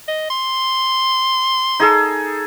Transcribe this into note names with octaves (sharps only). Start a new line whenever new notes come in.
D#5
C6
D#4 G#4 A4